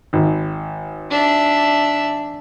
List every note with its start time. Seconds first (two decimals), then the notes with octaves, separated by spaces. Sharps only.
0.13 G#1
1.10 D4 E5